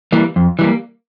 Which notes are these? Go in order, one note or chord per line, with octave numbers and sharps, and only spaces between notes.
E3 G3 A#3
F2
E3 G3 A#3